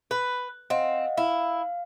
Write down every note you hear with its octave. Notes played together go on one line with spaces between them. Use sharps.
B4
C4 D#5 F5 F#5
E4 F5